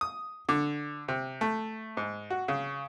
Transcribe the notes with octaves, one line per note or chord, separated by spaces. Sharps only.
D#6
D3
C3
A3
G#2
F#4
C#3